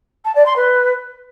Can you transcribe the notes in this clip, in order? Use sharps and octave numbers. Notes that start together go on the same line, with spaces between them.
A5
D5
C6
B4